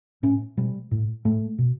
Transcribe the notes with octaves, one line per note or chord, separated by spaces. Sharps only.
A2 C#4
B2 G3
A2
A2 A3
B2